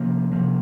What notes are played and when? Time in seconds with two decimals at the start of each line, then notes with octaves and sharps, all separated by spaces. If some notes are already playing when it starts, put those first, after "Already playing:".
Already playing: C3 F3 A#3
0.32 C3 F3 A#3